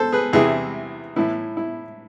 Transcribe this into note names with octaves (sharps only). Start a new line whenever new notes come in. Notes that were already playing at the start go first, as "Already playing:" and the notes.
Already playing: A4 C5
G#4 B4
E2 C3 E3 E4 G#4
A2 E3 E4
E4